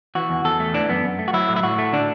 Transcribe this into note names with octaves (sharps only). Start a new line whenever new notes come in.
E3 F#4
E2
E2 A4
A3
E3 D4
F#2 B3
F#2
A3
F#4
F#3 E4
A2
E4
A2 F#4
A3
D3 D4